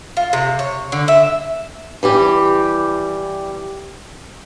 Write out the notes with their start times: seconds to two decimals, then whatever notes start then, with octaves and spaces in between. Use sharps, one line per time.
0.17 F4
0.33 C3
0.59 C#5
0.92 D3
1.08 E5
2.03 E3 G3 G4